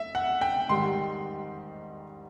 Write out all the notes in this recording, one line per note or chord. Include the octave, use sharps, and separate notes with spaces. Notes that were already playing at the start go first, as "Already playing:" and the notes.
Already playing: E5
F#5
G5
G#2 D#3 G3 C6